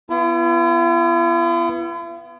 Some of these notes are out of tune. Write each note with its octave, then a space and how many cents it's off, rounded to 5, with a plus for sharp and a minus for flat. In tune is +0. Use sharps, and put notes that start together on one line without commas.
B3 +0 E4 +45